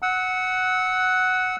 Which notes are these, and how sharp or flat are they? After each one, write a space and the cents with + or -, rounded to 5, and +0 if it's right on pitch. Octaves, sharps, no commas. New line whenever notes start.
F#5 +0 E6 -35